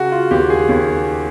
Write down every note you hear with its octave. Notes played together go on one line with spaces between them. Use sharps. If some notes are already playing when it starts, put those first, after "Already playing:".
Already playing: C#3 F#4
F4
D#2 G4
G#4
D#2